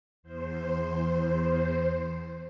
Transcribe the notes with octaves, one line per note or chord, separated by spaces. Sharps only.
E2 C5